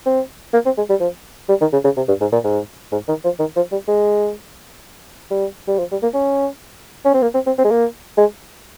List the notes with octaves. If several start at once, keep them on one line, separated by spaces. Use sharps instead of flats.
C4
A#3
C4
G#3
G3
F3
G3
D#3
C#3
C#3
C3
G2
G#2
A#2
G#2
G#2
D#3
F3
D#3
F3
G3
G#3
G3
G3
F3
G3
A#3
C#4
C#4
C4
A#3
C4
C4
C4
G#3
A#3
G#3